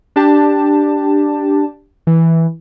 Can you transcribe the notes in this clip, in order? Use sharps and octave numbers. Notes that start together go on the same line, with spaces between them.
D4 G4 A5
E3